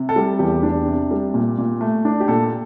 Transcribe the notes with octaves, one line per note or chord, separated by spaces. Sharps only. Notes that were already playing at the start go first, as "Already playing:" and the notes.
Already playing: C3
A4
G3
E2 G4
D4
C3
G3
A#2
A#2
A3
D4
G4
A#2 A4